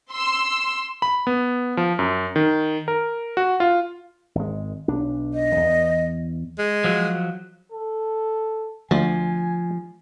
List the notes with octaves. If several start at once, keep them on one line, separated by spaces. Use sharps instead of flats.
C6 E6
B5
B3
F3
F#2
D#3
A#4
F#4
F4
G#1 G#3
B1 D4
D#5
E2
G#3
F3 F#3
A4
D2 F3 G#5